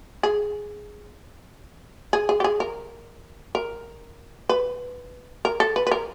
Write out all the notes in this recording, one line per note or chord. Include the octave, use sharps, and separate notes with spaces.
G#4
G#4
G#4
G4
G#4
A#4
A#4
B4
A#4
A4
B4
B4
A#4